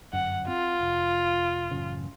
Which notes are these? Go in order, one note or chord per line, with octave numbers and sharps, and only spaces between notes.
G1 F#2 F#5
C4 F4
F1
A1 F#2 C#3